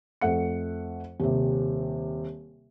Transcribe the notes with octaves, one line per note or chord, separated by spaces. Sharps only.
F2 A3 F#5 C#7
D#1 C3